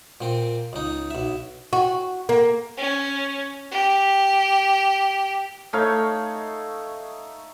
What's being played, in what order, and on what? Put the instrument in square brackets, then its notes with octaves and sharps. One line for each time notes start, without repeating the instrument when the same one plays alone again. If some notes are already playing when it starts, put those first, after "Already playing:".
[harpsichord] A#2 C4
C#2 D#4
B1 E5
[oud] F#4
A#3
[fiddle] C#4
G4
[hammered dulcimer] A3 D#4 C#5 F5